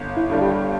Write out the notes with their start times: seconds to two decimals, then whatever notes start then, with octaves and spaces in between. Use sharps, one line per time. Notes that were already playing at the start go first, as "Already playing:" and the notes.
Already playing: G1
0.17 E4
0.30 G2 D3 G3
0.41 G4